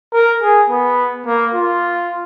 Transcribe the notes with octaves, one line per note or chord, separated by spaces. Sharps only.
A#4
G#4
B3
A#3
F4